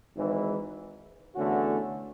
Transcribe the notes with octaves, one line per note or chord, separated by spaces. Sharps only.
G#1 G#2 E3
E2 D3 A3 C#4 F#4